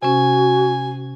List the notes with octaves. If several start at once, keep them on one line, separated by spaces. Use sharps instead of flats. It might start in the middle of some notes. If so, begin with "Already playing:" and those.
C3 C#4 F#4 G#5